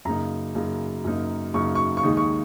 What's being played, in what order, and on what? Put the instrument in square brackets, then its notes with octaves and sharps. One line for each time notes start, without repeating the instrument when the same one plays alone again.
[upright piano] F#2 C#3 A#3 D#4 A#5
F#2 C#3 A#3 D#4
F#2 C#3 A#3 D#4
F#2 C#3 A#3 D#4 C#6
C#6
C#6
D#2 D#3 G#3 D#4
C#6